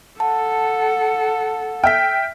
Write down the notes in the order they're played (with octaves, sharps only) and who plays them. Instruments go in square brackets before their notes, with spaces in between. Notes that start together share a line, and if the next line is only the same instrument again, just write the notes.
[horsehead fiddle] A4 [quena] F#5 [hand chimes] A5
[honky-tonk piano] E5 G5 [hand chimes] F6 B6